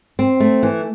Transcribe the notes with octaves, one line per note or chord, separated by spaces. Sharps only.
C4
A3
E3